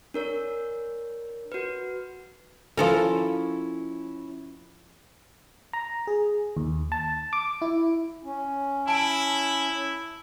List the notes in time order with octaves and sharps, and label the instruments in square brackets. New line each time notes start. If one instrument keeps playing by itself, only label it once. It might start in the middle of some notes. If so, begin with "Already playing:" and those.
[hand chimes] D4 A#4 C#5
F#4 B4
[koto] F3 A4 A#4 [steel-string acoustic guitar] C#4 E4
[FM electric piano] A#5
G#4
D#2
A5
D6
E4
[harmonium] C#4
[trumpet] E4 [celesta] A5 D7